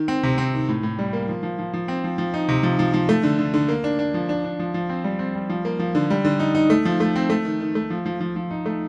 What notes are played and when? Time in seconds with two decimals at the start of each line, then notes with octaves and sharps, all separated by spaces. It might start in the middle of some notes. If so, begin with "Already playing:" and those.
Already playing: D#3
0.08 C4
0.23 C3
0.38 C4
0.54 D#3
0.68 A2
0.83 A2
0.99 G3
1.13 A#3
1.28 F3
1.43 F3
1.59 F3
1.73 F3
1.88 C4
2.04 F3
2.18 F3
2.34 D#4
2.49 C3
2.63 F3
2.79 F3
2.94 F3
3.09 A3
3.23 D3
3.39 D3
3.54 D3
3.69 A#3
3.84 D4
3.99 D4
4.14 F3
4.29 D4
4.44 D4
4.59 F3
4.74 F3
4.89 C4
5.04 G3
5.19 C4
5.35 G3
5.50 F3
5.65 A#3
5.79 F3
5.95 D3
6.10 G3
6.25 D3
6.40 D#4
6.55 D#4
6.70 A3
6.85 F3
7.00 A3
7.15 C4
7.30 A3
7.45 D#3
7.60 D#3
7.75 A3
7.90 F3
8.06 F3
8.20 F3
8.36 F3
8.51 D#4
8.66 A3